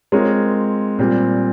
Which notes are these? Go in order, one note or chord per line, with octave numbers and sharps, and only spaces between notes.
G#3 C4 F4 A#4 C#5
A#2 G3 C4